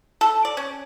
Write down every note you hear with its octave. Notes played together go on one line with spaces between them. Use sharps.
A4
D5
C#4